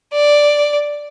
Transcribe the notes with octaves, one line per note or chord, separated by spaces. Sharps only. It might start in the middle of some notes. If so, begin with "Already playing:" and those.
D5